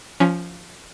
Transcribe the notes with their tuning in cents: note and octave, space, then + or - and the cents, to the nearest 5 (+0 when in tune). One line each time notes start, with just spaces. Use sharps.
F3 +0 C#4 +20 G#5 +0